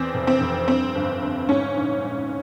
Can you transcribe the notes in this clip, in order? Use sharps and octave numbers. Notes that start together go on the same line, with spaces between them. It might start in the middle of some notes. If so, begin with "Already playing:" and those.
Already playing: E2 C4
F1
C4
F1
G2 C4
G1
G1
G#2 C#4
A#1
A#1